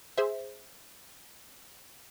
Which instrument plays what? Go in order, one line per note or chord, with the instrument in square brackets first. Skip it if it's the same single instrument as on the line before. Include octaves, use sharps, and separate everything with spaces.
[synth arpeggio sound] G#4 C5 E5